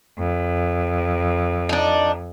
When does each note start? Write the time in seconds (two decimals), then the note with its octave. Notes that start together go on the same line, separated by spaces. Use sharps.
0.19 F2
1.69 D4 D#4